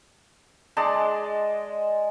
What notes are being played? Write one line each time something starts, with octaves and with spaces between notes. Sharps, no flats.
G#3 D4 D#5 A5